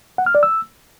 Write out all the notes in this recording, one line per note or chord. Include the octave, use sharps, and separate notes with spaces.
F#5
F6
D5
E6